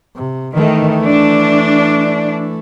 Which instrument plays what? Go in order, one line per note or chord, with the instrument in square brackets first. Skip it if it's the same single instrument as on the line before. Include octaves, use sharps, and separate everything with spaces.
[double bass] C3
[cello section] D#3 [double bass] E3 A3
[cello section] D4